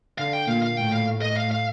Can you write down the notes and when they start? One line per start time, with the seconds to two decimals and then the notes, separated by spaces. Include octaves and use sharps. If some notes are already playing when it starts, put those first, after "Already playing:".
0.18 D3 F5
0.33 G5
0.48 A#2 F5
0.62 F5
0.77 A2 G5
0.92 F5
1.22 D#5
1.37 F5
1.51 F5